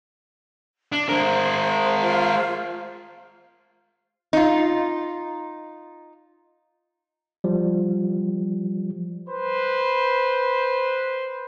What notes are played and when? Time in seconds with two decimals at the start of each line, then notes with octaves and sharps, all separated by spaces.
0.92 D4
1.09 G#3 A#4 C5
2.01 F4 C5
4.33 D#4 F4
7.44 F3 G3
9.29 B4 C5